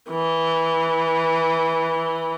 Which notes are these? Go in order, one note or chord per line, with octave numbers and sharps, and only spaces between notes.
E3